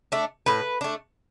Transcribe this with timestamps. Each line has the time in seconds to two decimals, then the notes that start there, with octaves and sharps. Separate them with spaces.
0.12 A3 D4
0.46 A2 B4
0.81 A3 D4